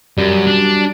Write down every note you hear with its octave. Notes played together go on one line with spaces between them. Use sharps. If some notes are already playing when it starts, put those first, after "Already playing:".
F#2 G3 F#4
D4